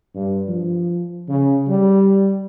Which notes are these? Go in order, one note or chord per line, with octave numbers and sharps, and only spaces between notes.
G2
F3
C#3
G3